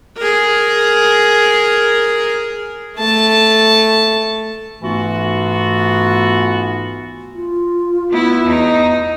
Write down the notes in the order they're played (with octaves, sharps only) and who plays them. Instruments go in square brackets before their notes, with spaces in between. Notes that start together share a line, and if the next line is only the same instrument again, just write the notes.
[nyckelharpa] G#4 A#4
A3 A5
[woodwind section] G#2 E3 A3 B3 F4 F#4
[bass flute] F4
[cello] B3 E4
E2 D#4